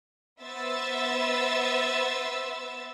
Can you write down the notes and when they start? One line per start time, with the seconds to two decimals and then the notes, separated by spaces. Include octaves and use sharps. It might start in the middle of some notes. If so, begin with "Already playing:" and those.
0.42 B3 C5 E5 E6 A6